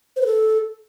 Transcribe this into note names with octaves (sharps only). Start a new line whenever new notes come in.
C5
B4
A4